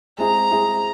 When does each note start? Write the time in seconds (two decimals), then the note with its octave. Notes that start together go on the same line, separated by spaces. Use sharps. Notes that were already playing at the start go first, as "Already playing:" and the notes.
0.18 G#3 C4 E4 G#4 A#5
0.51 G#3 C4 E4 G#4